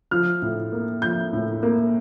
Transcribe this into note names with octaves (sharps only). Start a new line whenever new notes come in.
F3 F6
A2
A#3
F3 G6
A2
A#3